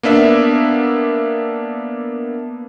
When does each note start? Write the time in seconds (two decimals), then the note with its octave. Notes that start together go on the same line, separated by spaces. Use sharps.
0.03 A#3 B3 D4 E5